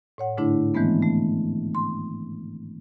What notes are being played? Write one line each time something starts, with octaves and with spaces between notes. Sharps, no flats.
A2 C#5 F#5
G#2 D3 A3 D4 E4
D#3 E3 G#3 A3 B3 C4
A3
C6